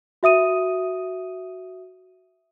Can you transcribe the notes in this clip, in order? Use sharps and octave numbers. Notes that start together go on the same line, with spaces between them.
F#4 E5 D#6 D#7